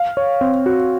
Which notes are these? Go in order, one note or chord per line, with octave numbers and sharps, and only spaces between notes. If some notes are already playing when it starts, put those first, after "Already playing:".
Already playing: F5
C#5
C4
F#4